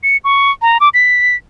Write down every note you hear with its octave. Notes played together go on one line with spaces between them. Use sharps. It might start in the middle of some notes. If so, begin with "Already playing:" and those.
C#7
C#6
A#5
D6
B6